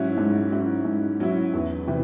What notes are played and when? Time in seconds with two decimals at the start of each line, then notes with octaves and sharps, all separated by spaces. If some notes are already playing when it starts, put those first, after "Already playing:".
Already playing: G#2 F#3 C#4 E4
0.18 G#2
0.52 F#3 C#4 E4
0.85 G#2
1.20 F#3 C#4 E4
1.54 E2
1.87 C3 E3